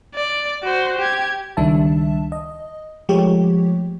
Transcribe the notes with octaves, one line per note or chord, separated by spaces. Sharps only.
D5
F#4 C5
G4 G#6
C#2 D#3 G3 D4 E5 A5
D#5
F3 G#3 A3 G4 C#5